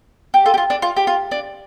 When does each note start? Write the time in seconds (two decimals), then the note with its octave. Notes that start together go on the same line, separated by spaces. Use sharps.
0.34 G4
0.46 F4 A4
0.54 G4
0.58 F4
0.70 D4
0.82 F4
0.97 G4
1.07 F4
1.31 D4